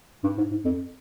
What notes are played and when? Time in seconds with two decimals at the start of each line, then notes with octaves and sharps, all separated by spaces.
0.24 G2
0.38 G#2
0.51 G#2
0.65 F2